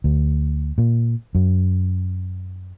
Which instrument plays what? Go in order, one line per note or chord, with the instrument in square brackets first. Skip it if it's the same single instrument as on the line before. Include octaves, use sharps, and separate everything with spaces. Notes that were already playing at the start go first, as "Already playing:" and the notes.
[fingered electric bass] D2
A#2
F#2